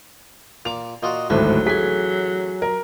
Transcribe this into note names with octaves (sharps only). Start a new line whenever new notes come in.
A#2 D6 F7
A#2 F4 F#4 D#5
G#1 D2 A2 F#3 A3
A1 G#4 G#5 B6
A#4